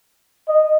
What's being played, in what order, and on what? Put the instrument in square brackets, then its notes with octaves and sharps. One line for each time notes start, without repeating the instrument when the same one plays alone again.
[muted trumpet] D#5